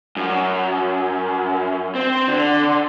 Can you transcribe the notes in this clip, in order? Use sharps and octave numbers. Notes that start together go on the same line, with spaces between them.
F#2
C4
D3